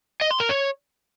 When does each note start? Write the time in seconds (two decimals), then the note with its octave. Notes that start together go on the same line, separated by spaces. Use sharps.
0.21 D#5
0.31 C6
0.40 A#4
0.49 C#5